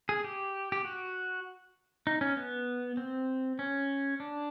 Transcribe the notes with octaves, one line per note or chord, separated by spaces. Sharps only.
G#4
G4
G4
F#4
D#4
C#4
B3
C4
C#4
D4